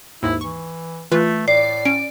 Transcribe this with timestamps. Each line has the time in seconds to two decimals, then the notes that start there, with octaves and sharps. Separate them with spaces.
0.23 D#2 G#2 E4
0.41 E3 C#6
1.12 E3 A3 F4 B4
1.48 A2 D5 C7
1.85 C#4 D7